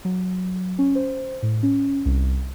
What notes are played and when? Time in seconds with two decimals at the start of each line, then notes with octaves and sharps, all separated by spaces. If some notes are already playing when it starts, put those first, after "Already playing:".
0.05 F#3
0.79 C#4
0.95 C5
1.43 A2
1.63 C#4
2.05 C2